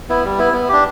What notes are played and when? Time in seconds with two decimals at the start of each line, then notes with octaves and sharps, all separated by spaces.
0.09 B3 E4
0.24 G3
0.39 B3 E4
0.53 B3
0.69 D4 G4